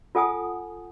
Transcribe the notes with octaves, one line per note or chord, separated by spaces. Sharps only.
F4 A4 F#5 G#5 A5 D#6